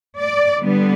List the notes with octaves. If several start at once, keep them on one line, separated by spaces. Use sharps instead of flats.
D5
D3 G3 B3